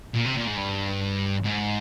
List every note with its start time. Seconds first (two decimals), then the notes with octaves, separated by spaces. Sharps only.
0.14 A#2
0.25 C3
0.35 A#2
0.47 G#2
0.57 G2
1.44 G#2